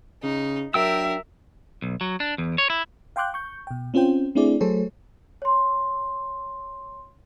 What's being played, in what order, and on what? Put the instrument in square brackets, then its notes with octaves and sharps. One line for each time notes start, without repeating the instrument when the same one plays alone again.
[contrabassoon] C#3 [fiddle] D#4
[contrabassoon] F#3 [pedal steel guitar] D4 G5 E6 [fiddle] A#4 [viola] E5
[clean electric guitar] B1
F#3
D4
E2
C#5
E4
[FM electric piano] F5 G5 C6 D6 F#6 G6
C#6 G6
B2 G5
C4 C#4 F4 C5 G5
A3 C4 D4 E4 G#4 D5
F#3 A3 G#4 A4 C5 C#5
[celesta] C#5 C6